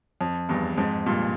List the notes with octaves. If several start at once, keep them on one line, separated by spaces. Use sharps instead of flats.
F2
E2 G2
F2 G#2
G2 A#2